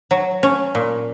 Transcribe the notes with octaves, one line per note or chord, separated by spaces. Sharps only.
F#3
C#4
A#2